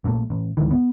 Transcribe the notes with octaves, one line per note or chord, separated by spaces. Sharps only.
A#1 A#2 C#3 A3
A1
D2 G#2 D#3 E3
B3